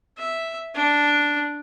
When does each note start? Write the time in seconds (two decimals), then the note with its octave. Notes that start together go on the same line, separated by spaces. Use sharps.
0.18 E5
0.75 D4